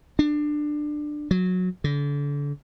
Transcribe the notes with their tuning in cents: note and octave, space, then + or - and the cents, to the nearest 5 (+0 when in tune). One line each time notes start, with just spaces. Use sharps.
D4 +20
F#3 -15
D3 -35